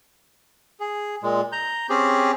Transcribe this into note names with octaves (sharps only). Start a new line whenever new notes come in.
G#4
A#2 G#3
A#5 G6
C4 C#4 G4 G#4